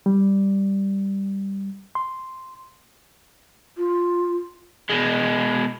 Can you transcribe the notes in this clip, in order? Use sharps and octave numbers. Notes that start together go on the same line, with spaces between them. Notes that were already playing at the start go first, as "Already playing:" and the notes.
G3
C6
F4
B2 G#3